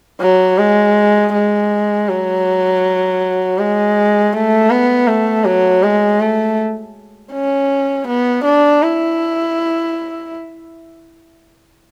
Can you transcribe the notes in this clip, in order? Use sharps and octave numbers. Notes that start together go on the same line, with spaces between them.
F#3
G#3
G#3
F#3
G#3
A3
B3
A3
F#3
G#3
A3
C#4
B3
D4
E4